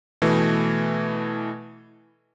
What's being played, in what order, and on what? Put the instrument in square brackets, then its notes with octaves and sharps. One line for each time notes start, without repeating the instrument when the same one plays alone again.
[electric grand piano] B2 E3 A3